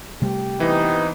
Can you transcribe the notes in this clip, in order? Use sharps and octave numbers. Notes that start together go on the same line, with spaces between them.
C3 G3 A3 G4
E3 B3 C4 D#4